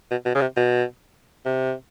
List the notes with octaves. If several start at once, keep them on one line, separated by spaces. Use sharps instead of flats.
B2
B2
C#3
C3
B2
C3